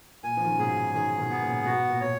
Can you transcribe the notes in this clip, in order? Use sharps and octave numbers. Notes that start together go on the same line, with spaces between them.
A#2 G#5
F3
D#3
C#3
G#2 B2 G#4
D#3 F#3 G#4
B2 D#3
B3
A#2 C#3
G#2 B2 F#4
A#2
B2 C#5